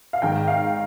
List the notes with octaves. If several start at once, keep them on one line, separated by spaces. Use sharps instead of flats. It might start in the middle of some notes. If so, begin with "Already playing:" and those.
F5
G#1 G#2 D#3 G5
F5